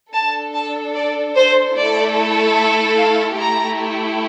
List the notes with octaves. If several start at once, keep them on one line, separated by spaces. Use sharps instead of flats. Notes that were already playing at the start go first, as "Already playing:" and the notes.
D4 A4 A5
A5
D5
C5
A3 E4 A4 D5
E5
F5
A3 E4 G4 A#5